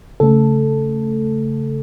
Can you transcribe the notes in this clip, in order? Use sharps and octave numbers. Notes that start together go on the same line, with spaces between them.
C#3 A3 A4